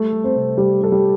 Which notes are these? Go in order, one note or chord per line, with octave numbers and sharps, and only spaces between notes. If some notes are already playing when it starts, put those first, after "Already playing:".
Already playing: G3 A3 A4
G3
C4 C5
C3
G3 G4
G3
A4
G3 G4